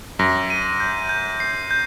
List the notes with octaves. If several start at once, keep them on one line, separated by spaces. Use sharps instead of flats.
F#2 A#6
D#7
G6
G6
C7
G6